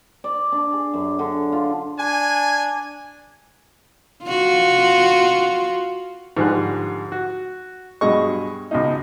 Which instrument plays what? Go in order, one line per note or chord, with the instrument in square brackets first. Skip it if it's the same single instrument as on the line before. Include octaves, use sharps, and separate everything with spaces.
[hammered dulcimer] D5
D4
G#4
F#2
D3
F4
[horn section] D4 G#5
[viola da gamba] F4 F#4
[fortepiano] G#2 D3 F3 G3 G#4 F#6
F#4
G2 B2 F#3 G#3 D#5 C#6
C#2 B2 D#4